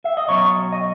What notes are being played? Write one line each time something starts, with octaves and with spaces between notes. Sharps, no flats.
E5
D#5
B2 F#3 C#4 C#5
D#5